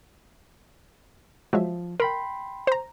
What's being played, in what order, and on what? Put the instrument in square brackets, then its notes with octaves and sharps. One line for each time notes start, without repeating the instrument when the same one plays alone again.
[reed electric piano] F3 [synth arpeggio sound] F#3 G#3 E5
[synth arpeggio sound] A#4 [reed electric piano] G5 B5 C6
[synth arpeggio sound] C5 A#5